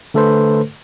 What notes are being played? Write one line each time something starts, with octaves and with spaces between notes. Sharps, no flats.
D3 A3 A4 B4 C5